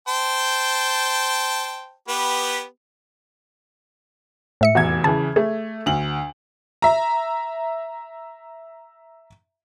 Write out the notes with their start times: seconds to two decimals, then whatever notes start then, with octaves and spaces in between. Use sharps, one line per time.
0.08 C5 G5 A5
2.08 B3 G4 B4
4.61 A2 E5 C#7
4.75 F1 E2 F#4 G#6
5.04 C#3 E3 A5
5.36 A3 G#4
5.86 D2 F#7
6.82 E5 A#5